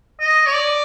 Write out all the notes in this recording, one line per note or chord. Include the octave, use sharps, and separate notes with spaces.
D#5
C#5
D5